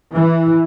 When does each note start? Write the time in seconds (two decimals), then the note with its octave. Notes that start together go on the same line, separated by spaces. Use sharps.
0.11 E3